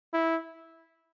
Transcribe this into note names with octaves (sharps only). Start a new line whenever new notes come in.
E4